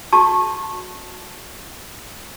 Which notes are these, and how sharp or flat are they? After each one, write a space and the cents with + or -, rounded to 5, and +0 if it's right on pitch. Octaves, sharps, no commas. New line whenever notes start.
F#4 -25 A5 +0 C#6 -20